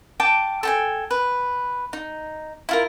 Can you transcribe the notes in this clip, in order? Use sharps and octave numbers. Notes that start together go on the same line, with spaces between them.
G5 A5 D6
A4 G5 G#5
B4
D#4
E4 F4 A#4